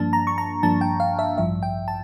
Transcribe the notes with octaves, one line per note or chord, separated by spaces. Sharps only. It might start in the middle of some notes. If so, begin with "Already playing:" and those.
Already playing: G2 F3 A#3 D4 A5
A#5
C#6
A#5
G2 F3 A#3 D4 A5
G5
F5
E5
A1 G2 F3 E5
G5
A5